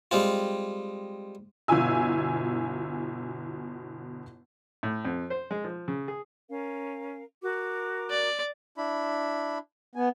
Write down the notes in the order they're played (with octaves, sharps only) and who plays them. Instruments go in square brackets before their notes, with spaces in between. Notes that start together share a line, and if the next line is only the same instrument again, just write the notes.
[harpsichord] G3 G#3 C4 F4
[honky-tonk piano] G1 B2 E4 F4 G#5 E6
[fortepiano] A2
F2
C5
G#3
F3
C#3
G#4
[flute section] C#4 A#4 F5
F#4 A#4 D6
[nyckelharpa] D5
[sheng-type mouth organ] D4 E4 B5
[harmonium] B3 [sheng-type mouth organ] G#5